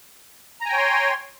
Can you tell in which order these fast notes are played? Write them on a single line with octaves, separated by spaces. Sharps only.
A#5 G#5 G5 C#5 C6